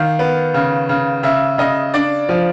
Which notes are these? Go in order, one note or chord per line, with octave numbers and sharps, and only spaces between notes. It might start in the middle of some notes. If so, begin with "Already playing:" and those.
Already playing: D#3 F5
B3
C#3
C#3
C#3 E5
C#3 D#5
D4 D5
F3